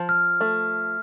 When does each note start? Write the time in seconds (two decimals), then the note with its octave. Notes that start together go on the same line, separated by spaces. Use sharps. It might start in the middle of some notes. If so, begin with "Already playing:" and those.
Already playing: F3
0.09 F6
0.41 A3